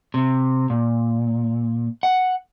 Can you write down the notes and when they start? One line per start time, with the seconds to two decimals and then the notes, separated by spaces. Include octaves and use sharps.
0.14 C3
0.70 A#2
2.03 F#5